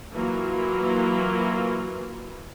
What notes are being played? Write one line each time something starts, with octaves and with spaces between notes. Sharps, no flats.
E3 F#3 A#3 E4 F4